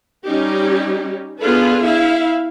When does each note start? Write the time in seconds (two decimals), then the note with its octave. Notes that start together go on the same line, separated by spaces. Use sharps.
0.25 G3 C#4 D#4 G4
1.39 B3 D4 F4 G#4 A4 B4
1.84 E4 E5 F5